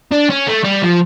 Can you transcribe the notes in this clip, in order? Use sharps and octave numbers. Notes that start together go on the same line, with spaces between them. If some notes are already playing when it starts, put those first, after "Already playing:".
D4
C#4
A3
G3
F3